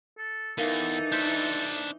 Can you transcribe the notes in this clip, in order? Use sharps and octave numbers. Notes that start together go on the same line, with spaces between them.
A4
E2 E3 D#4 A4 A#4 F5
D4 C5 G6 B6